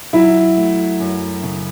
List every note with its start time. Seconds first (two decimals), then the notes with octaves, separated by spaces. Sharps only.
0.13 F#3 E4
0.57 A3
1.00 F#2
1.43 C#3